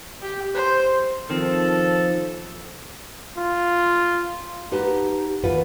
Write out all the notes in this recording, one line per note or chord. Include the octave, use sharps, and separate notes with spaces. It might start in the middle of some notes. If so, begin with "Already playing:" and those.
G4
C5
D#3 F3 C4 A4
F4
D#4 G4 B4 F#5 A5
D#2 E3 E4 F4 B4 F#5